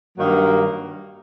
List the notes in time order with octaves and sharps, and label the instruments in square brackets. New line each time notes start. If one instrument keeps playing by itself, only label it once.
[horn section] G2 D#3 F#3 A#3